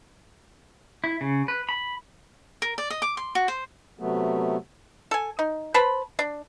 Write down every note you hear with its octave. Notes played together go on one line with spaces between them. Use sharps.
E4
C#3
B4
B5
A#4
D5
D#5
D6
C6
F#4
C5
C3 F#3 A3 B3
A4 G#5
D#4
B4 C5 A5 B5
D4